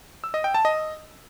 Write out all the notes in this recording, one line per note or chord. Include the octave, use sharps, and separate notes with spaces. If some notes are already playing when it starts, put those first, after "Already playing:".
E6
D#5
G5
A5
D#5